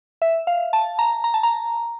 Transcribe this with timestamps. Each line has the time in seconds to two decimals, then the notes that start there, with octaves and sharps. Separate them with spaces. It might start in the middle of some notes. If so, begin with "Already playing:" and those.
0.22 E5
0.47 F5
0.73 A5
0.99 A#5
1.24 A#5
1.34 A5
1.43 A#5